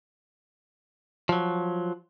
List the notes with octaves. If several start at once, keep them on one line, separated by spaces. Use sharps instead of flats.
F3 F#3